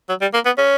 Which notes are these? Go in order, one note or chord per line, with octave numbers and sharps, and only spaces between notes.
F#3
G3
A#3
B3
C#4